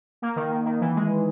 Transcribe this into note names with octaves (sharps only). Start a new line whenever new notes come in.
A#3
D#3
D#3
D#3
E3
G#3